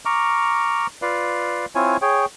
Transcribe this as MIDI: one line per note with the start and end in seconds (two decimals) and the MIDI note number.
0.05 0.87 82
0.05 0.87 85
0.05 0.87 86
0.05 0.87 89
1.02 1.66 65
1.02 1.66 71
1.02 1.66 74
1.02 1.66 77
1.75 1.97 60
1.75 1.97 64
1.75 1.97 65
1.75 1.97 73
1.75 1.97 80
2.02 2.25 68
2.02 2.25 73
2.02 2.25 79